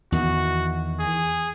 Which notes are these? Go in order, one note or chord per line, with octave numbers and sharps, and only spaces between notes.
E2 D#3 F#4
G#4